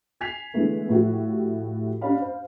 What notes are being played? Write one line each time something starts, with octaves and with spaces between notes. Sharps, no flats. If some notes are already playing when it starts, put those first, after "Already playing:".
G#5 G#6 B6 C7 F7
D3 E3 G#3 A3 B3
A2 F3 A3 F#4 G4
C#4 D4 G4 C#5 F5 B5
C5 F5